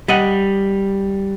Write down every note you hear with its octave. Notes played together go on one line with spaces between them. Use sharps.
G3 D#5 F#5